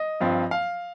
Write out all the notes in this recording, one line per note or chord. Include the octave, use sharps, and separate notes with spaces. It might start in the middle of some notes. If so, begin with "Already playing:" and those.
Already playing: D#5
G2 F3 C4
F5